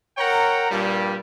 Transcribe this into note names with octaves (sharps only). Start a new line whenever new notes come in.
A#4 C#5 F#5 G5 A#5
G2 A#2 G3